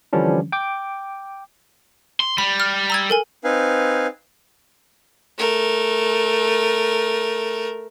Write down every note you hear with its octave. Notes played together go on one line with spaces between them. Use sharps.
D3 E3 F3 G3 C#4 D4
G5 D6
C6
G3 B5
F6
A#5 E6 G#6
A4 A#4 G#5
C4 D#4 B4 F5 G#5
A3 A#4